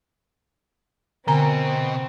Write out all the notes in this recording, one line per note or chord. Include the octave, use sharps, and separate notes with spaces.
B2 D3 C4 G#5 A#5